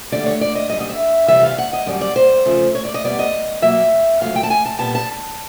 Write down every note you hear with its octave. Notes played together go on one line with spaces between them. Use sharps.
D2 D3 G3 D5
C#5
D5
D#5
F#2 D3 G3 D#5
D#5
E5
F2 C3 E3 G3 B3 E5
F5
F#5
D#5
F#2 D#3 G3 D5
D5
C5
E2 C#3 F3 A3
C#5
D5
D#5
B2 G3 B3 D5
D#5
B2 F#3 A#3 E5
F2 C#3 F#3 A3 F5
G5
A5
G#5
A5
A#2 G3 B3 A5
A5